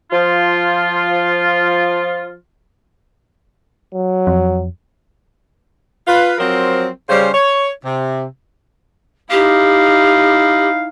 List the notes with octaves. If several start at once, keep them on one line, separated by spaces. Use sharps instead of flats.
F3 F4
F#3
F2
F4 B4
F3 F#3 C4 A#4 C5
C#3 G3 C#4 C5
C#5
C3
D#4 E4 G4 F5